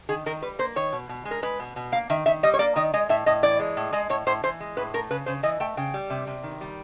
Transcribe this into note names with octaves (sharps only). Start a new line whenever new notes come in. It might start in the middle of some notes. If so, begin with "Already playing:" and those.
D#3 G#4
D#3 A#4
G3 B4
A#3 C5
D#3 C#5
B2
B2
G#3
A#4
G#3 B4
B2
B2
A#3 F5
D#3 E5
D#3 E5
G3 D#5
C#5
A#3 D5
D#3 D#5
G#3 D#5
A2 E5
A2 D#5
E3 D5
G#3
A2
G#3 D#5
A2 C#5
A2 C5
E3 C5
G#3
A2 B4
A3 A#4
C#3 B4
C#3 C5
E3 D#5
A3 G5
C#3 G5
G3
C3
C3
D#3
G3